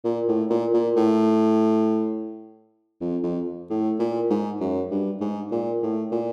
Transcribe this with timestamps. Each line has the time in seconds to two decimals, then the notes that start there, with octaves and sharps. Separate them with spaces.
0.05 A#2
0.28 A2
0.50 A#2
0.74 A#2
0.96 A2
3.01 F2
3.23 F2
3.70 A2
4.00 A#2
4.30 G#2
4.61 F#2
4.91 G2
5.21 G#2
5.51 A#2
5.83 A2
6.12 A#2